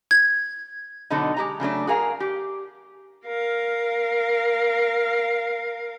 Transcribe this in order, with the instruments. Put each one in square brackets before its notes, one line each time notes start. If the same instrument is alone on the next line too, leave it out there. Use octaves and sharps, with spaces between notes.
[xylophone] G#6
[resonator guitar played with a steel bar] B2 D3 F#3 D#4 A4
G#3 G4 A#5
C#3 F#3 A3 D4
F#4 G#4 A#4 F5
G4
[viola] A#4 F5